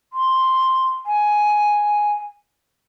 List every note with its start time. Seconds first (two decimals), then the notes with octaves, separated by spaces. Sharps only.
0.13 C6
1.06 G#5